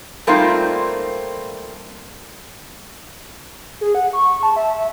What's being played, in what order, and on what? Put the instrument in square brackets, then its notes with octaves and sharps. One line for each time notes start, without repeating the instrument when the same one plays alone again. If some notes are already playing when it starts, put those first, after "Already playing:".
[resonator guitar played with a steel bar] G3 A3 A#3 C4 D#4 F4
[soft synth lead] G#4
F#5
C#6
A5
E5